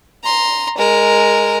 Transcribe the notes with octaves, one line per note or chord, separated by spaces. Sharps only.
A#5 C6
G#3 A#4